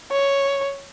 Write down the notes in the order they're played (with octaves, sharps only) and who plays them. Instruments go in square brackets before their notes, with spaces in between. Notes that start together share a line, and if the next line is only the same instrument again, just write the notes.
[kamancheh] C#5